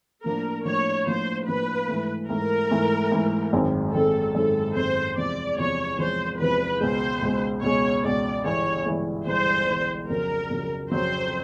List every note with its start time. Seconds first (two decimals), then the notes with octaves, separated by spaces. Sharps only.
0.24 A2 F3 A#3 D4 A#4
0.65 A2 F3 A#3 D4 C#5
1.06 A2 F3 A#3 D4 C5
1.47 A2 F3 A#3 D4 B4
1.88 G#2 E3 A3
2.29 G#2 E3 A3 A#4
2.71 G#2 E3 A3
3.12 G#2 E3 A3
3.53 G#1 F#2 D#3 G#3 C4
3.93 G#1 F#2 D#3 G#3 C4 A4
4.34 G#1 F#2 D#3 G#3 C4 A4
4.75 G#1 F#2 D#3 G#3 C4 C5
5.16 E2 C3 F3 G#3 D5
5.58 E2 C3 F3 G#3 C#5
5.98 E2 C3 F3 G#3 C5
6.39 E2 C3 F3 G#3 B4
6.80 C#2 B2 G#3 C5
7.22 C#2 B2 G#3
7.62 C#2 B2 G#3 C#5
8.04 C#2 B2 G#3 D5
8.44 G1 G2 E3 G#3 C#5
8.86 G1 G2 E3 G#3
9.27 G1 G2 E3 G#3 C5
9.67 G1 G2 E3 G#3
10.09 F2 C#3 F#3 A#4
10.50 F2 C#3 F#3
10.91 F2 C#3 F#3 C5